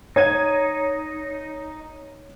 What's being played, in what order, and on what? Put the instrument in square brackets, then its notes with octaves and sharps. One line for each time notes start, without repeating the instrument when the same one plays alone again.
[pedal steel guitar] D#4 [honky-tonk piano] C#5 G#6 D#7